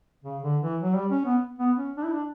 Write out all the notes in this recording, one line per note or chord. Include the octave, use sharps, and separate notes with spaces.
C#3
D3
E3
F#3
G3
C#4
B3
B3
C#4
D4
E4
D4